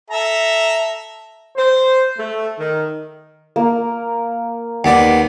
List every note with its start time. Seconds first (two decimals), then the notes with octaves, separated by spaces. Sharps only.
0.10 A4 E5 A#5
1.56 C5
2.18 A3
2.58 D#3
3.56 A#3
4.84 D#2 B3 D5